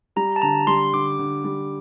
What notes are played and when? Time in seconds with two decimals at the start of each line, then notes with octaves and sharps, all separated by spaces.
0.16 G3 A#5
0.36 A5
0.42 D3 A#5
0.67 G3 C6
0.93 D3 D6
1.19 D3
1.44 G3